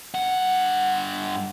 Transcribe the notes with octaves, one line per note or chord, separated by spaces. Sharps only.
G2 F#5